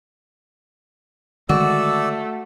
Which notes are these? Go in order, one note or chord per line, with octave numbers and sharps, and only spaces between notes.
D3 D#3 G#3 A3 F#4 D5 E6